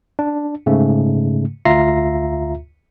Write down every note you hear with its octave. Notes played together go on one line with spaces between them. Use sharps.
D4
G#2 C#3 A3
D2 F4 E5 A#5 A#6 C7